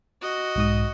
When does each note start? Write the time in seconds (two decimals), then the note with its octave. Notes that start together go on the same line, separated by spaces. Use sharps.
0.22 F#4 D#5
0.55 B1 G#2 D#6